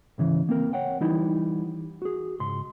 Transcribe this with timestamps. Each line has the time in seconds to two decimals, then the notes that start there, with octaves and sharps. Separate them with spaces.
0.18 G#2 C#3 E3
0.49 A#3 C4 A#4
0.73 C#5 F#5 G5
1.00 E3 G3 D#4 E4
2.02 F#4 G#4
2.40 C#2 G#2 C6